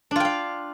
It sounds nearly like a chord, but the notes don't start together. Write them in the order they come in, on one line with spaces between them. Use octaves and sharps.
D4 F4 G5 F5